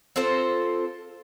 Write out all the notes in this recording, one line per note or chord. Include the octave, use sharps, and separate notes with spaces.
C4 F4 A4 C5